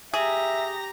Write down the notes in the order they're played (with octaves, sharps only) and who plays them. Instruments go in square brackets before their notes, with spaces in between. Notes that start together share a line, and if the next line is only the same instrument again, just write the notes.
[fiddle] G4 A#5 [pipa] G#4 [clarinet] E5